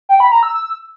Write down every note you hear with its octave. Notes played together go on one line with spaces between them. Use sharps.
G5
B5
A#5
E6